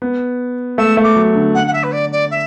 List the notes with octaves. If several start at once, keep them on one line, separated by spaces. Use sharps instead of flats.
B3
A3 E6
A3
D6
F#3
D3
D3 F#5
F#5
E5
B4
D5
D5
E5